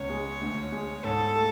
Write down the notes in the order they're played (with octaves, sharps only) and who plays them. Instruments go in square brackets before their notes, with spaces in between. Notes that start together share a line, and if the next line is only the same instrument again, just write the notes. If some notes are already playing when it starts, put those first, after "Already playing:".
Already playing: [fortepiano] C#2 [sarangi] C#5
[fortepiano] G#3
D2
G#3
[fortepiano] G#2 [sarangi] A4
[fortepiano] A3